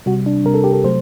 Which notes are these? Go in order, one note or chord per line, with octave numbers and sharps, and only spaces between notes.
C3 G3 F#4
D4
C3 G3 A#4
A4
G4
A4
C3 F#3 A3 C5